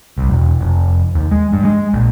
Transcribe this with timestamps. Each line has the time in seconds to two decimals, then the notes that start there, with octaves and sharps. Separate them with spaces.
0.18 C2
0.29 E1
0.61 F1
1.15 D#2
1.31 G#3
1.53 G2
1.65 G#3
1.94 A#1